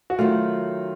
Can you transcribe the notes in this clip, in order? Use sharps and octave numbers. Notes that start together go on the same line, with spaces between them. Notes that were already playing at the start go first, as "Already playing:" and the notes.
F#4
D#3 F#3 A3 F4